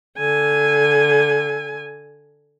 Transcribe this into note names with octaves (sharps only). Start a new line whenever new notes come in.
D3 G#5